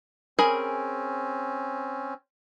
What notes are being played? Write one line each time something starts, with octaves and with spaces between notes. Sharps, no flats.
C4 C#4 G#4 A#4 B5